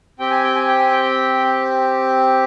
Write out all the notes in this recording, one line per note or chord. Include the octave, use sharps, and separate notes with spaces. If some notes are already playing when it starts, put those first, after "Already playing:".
C4 G4 G5
G#5
G5
G#5
G5
G#5
G5